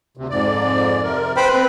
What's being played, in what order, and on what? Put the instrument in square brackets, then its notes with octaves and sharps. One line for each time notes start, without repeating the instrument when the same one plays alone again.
[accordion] D2 C3
F2 G#2 D5
C3 A#4
[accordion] B4 [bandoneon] C5 G5 B5
[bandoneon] C4